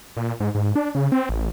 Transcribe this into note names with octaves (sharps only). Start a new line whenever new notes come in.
A#2
G#2
G#2
D4
C#3
C4
A1